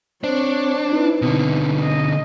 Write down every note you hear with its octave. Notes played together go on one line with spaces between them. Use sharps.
C4 D4 C5 C#5
D#4 E4 B4
B2 D3 C4
D#5